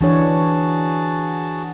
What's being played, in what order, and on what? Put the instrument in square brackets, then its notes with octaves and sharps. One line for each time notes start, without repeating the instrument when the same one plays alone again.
[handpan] E3 D4 C#5 [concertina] F#4 G#4 A5